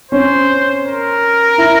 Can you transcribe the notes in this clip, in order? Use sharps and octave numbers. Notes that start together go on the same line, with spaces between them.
C#4 C5
A#4
E4